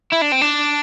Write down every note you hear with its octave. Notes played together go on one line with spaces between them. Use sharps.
E4
D4
C4
D4